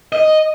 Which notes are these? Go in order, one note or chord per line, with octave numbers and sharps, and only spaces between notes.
D#5